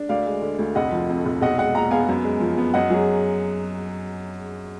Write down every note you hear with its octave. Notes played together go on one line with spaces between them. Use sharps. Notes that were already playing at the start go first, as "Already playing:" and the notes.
Already playing: D4
D2 D5 F5
G#3
D3
D2
F1 D#5 F#5
F3
F2
F1
B1 D#5 F#5
G#3 D#5 F#5
A#2 F#5 A#5
B3 F5 G#5
F#2
G#3
F3
B3
F#2 D#5 F#5
F#3 G#4